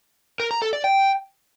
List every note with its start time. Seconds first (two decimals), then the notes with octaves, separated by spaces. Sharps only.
0.40 A#4
0.51 A#5
0.62 A4
0.73 D5
0.84 G5